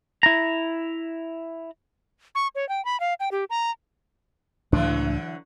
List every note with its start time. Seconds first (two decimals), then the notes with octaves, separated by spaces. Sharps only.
0.23 E4 A#5
2.35 C#6
2.55 C#5
2.69 G5
2.85 B5
3.00 F5
3.20 G5
3.32 G4
3.50 A#5
4.72 C#2 A2 D3 E3 F#3 D4